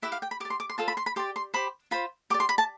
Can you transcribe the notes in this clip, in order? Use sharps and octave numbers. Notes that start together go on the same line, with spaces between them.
E4 G4 B4 E5
F5
G5
B5
G4 D5 D6
C6
D6
C6
F4 A4 C5 A5
B5
C6
B5
G4 D5 C6
C6
G4 C5 B5
F4 C5 B5
G4 D5 D6
C6
B5
A5